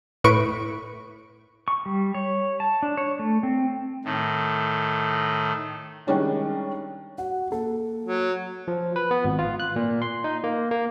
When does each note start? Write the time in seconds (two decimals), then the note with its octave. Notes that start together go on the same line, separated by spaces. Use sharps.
0.24 A2 B4 C#6 D7
1.68 C#6
1.86 G3
2.14 C#5
2.60 A5
2.83 D4
2.97 C#5
3.19 A3
3.43 C4
4.04 A2 D#3
6.07 D#3 G3 G#3 C#4 D4
7.18 F#4 F#5
7.52 A#3 A4
8.05 F#3
8.68 F3
8.96 B4
9.11 B3
9.24 G#1
9.39 F4
9.60 F#6
9.76 A#2
10.02 C6
10.24 D#4
10.44 A#3
10.71 A#3